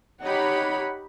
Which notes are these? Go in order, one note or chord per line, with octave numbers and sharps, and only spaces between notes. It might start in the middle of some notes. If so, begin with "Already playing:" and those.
D#4 G4 C#5 F#5 B5